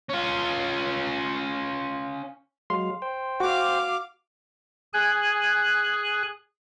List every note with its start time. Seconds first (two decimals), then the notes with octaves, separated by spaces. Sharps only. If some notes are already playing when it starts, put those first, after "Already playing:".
0.10 C#4 F4
2.70 F#3 G#3 F5 C6
3.02 C5 G5
3.40 F#4 F5 D6
4.93 G#4 G#5 F#6